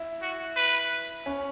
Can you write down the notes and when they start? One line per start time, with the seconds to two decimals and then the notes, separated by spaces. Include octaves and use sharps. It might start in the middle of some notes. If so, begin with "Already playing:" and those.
Already playing: E4
0.22 F#4
0.56 B4
1.26 C#4